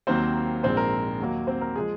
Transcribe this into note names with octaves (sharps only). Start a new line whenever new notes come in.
D#2 D#3 F#3 A#3 C4 C5
A#1 G#2 F3 G#3 C4 C5
A#4
D#2 D#3 F#3 A#3
C4 C5
A#4
F3 G#3 G#4